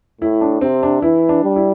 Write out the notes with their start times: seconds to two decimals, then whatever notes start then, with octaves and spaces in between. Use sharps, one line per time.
0.21 A2 E4
0.41 D4
0.61 C3 C4
0.83 D4
1.02 E3 E4
1.29 D4
1.43 G3
1.56 E4